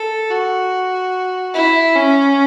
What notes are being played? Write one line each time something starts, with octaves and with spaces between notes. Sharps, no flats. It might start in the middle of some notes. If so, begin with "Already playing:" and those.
Already playing: A4
F#4
E4
C#4